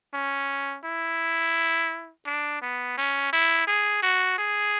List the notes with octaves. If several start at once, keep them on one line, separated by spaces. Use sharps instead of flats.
C#4
E4
D4
B3
C#4
E4
G#4
F#4
G#4